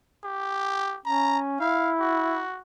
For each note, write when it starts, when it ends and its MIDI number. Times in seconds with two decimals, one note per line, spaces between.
0.24 0.98 67
1.06 1.57 61
1.06 1.38 82
1.60 2.43 64
1.60 1.91 77
2.00 2.61 66